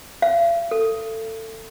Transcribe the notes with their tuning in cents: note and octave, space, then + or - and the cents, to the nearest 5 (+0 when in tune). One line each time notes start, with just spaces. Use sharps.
F5 -45
A4 +20